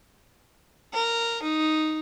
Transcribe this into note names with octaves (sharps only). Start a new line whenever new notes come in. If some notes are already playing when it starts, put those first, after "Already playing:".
A#4
D#4